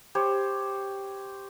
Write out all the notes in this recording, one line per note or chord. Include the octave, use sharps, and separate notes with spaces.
G4 C5 C#5